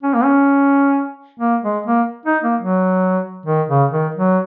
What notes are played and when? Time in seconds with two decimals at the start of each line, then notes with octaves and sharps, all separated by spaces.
0.03 C#4
0.14 A#3
0.24 C#4
1.40 A#3
1.62 G#3
1.86 A#3
2.26 D#4
2.43 A#3
2.60 F#3
3.46 D#3
3.69 C#3
3.91 D#3
4.14 F#3